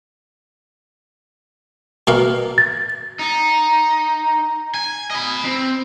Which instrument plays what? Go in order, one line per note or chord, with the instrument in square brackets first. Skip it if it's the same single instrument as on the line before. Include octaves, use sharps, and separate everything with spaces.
[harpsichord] B2 A#3 F5
[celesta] A6
[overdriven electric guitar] D#4
G#5
D#5 B5
C4